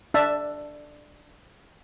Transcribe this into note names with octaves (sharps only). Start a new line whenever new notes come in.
D4 E5 A5